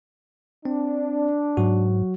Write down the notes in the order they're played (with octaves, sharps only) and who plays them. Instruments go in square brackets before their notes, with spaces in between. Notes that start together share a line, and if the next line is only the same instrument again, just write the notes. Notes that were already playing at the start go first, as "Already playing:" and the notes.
[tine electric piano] C4 [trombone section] D4
[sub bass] G#2 [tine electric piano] F#3 F#4